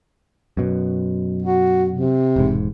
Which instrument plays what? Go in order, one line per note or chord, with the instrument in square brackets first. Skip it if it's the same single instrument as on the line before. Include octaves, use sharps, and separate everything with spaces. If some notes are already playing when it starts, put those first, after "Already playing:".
[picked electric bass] F#2 B2
[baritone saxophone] F#4
C3
[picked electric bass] E1 G#2